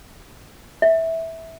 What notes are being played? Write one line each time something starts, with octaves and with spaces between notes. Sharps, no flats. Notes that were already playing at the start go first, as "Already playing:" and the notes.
E5